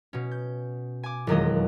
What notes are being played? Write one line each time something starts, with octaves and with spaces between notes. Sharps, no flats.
B2 C#4
G6
G#5 D6
E1 F2 D#3 F#3 G#3 D#5